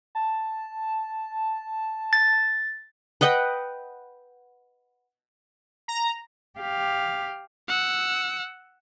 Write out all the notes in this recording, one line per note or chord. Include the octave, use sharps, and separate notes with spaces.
A5
A6
B4 D#5 F#5 G5
A#5
G4 F5
F#5 E6